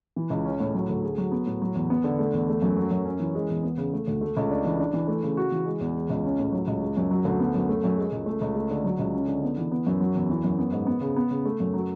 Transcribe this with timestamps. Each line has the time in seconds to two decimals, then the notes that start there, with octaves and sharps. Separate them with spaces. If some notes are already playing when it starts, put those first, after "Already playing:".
0.16 E3
0.30 C#2
0.45 C#4
0.60 A2
0.74 F#3
0.89 D2
1.03 G#4
1.18 F#3
1.32 B3
1.47 A2
1.62 F#3
1.75 E2
1.90 B3
2.04 D3
2.19 A3
2.33 E2
2.49 A3
2.62 F#2
2.77 F#3
2.91 F#2
3.05 C#4
3.20 E3
3.35 G#3
3.50 E2
3.63 B3
3.78 C#3
3.93 A3
4.08 D2
4.21 A3
4.37 C#2
4.51 D4
4.65 E3
4.79 D4
4.93 E3
5.08 A3
5.23 C#3
5.37 F#4
5.52 E3
5.66 G#3
5.81 E2
5.95 G#3
6.10 C#2
6.25 C#4
6.39 A2
6.53 F#3
6.67 C#2
6.83 G#3
6.97 F#2
7.11 F#3
7.25 D2
7.39 B3
7.55 F#2
7.69 A3
7.84 F#2
7.98 G#3
8.12 C#2
8.26 A3
8.41 C#2
8.55 A3
8.71 D3
8.84 F#3
8.99 C#2
9.14 C#4
9.28 D3
9.43 B3
9.58 E3
9.72 B3
9.87 F#2
10.01 F#3
10.15 E2
10.30 E3
10.44 F#2
10.59 B3
10.72 G#2
10.87 B3
11.01 C#3
11.16 B3
11.31 C#3
11.45 A3
11.60 F#2
11.74 F#3